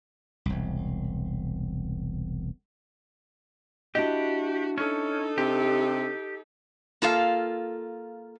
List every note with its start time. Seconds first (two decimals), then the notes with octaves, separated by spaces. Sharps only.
0.46 E1 C2
3.95 D4 E4 F#4 G4 D#5
4.78 C#4 D#4 A4
5.38 C3 G4
7.02 A#3 F4 A4 F5